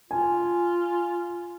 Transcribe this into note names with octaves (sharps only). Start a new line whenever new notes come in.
F4 G#5